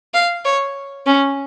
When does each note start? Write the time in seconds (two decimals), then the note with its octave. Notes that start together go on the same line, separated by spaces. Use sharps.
0.14 F5
0.45 C#5
1.07 C#4